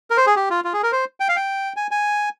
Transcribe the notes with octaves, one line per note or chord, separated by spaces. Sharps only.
A#4
C5
G#4
G4
F4
F4
G#4
A#4
C5
G5
F5
G5
G#5
G#5